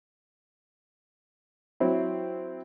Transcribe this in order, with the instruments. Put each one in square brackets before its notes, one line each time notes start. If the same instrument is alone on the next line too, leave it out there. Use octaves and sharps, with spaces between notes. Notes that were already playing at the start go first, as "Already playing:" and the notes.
[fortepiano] F#3 C4 E4